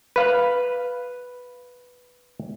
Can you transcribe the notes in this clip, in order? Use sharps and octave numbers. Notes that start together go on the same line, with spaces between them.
B4 F5